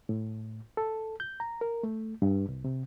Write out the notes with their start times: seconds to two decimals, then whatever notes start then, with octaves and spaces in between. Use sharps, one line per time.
0.09 A2
0.77 A4
1.20 G6
1.40 A#5
1.61 A#4
1.83 A3
2.22 G2
2.48 C2
2.64 C3